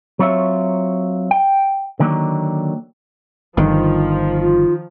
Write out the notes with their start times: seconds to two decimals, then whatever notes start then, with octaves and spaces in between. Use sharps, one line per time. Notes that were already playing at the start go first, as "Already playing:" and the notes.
0.19 F#3 C4 F4 C#5 E5
1.31 G5
2.00 D3 D#3 F#3 A#3
3.57 G1 D3 D#3 F3
4.38 F4